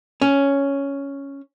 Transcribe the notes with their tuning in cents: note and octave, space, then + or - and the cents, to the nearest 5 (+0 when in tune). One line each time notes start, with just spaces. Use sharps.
C#4 +5